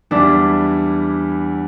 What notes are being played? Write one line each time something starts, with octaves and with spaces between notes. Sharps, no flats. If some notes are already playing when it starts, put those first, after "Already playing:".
E2 E3 G3 D4 E4